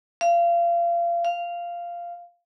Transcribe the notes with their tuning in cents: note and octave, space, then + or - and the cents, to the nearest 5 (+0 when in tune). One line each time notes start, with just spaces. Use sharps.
F5 -30
F5 -10